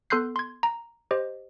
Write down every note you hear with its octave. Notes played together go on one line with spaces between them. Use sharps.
B3 A4 C6 F#6 G6 C7
C6 G#6
A#5
G4 C5 D#5